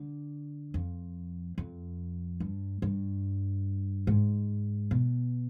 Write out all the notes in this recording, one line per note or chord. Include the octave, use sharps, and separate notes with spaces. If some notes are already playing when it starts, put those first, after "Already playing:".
Already playing: D3
F2
F2
G2
G2
G#2
B2